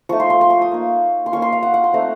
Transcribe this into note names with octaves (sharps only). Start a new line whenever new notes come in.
F3 A3 D#4 C#6
C6
C6
C6
C#6
D#6
A#3 D#4
C6
A#3 C#4 F4 C#6
C6
F5
F#5
F#5
C6
A3 C4 D#4 A#5